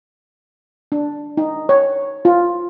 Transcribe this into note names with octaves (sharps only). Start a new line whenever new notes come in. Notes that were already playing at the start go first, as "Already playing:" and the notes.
D4
D#4
C#5
F4